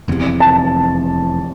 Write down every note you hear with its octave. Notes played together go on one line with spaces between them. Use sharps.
F1 E2 C3
A5